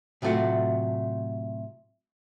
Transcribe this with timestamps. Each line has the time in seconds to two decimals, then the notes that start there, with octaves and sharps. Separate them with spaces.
0.22 A2 C3 F#3 A3 F4 F#4